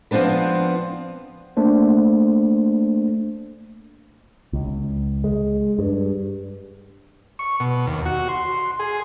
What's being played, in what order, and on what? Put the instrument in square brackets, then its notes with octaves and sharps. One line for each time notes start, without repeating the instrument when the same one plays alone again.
[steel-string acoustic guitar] F3 B3 C4 D4 B4
[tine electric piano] A3 A#3 D4 C5
[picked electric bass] C#2
G#3
G2
[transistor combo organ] C#6
B2
D#2
F#4
C6
G#4